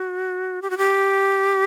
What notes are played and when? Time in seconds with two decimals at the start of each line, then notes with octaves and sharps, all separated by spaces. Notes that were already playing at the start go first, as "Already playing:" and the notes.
Already playing: F#4
0.62 G4
0.70 F#4
0.78 G4